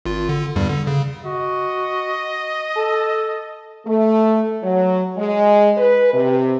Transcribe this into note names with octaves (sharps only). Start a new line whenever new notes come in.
G#1 F4
D3
E2 G2 G3
D3
C#3
F#4 D#5
A4
A3
F#3
G#3
B4
C3